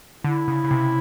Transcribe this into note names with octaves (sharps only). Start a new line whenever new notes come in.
D3 E4
C#3
C#3
C3